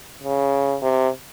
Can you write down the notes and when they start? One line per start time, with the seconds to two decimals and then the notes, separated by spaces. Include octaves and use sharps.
0.24 C#3
0.82 C3